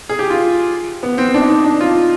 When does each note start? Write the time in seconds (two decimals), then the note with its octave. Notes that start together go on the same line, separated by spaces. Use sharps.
0.09 G#4
0.19 G4
0.30 F4
1.03 B3
1.18 C4
1.34 D4
1.41 D#4
1.50 D4
1.64 D4
1.81 F4